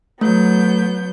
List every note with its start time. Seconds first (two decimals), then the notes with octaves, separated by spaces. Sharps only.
0.21 F#3 A3 B3 G6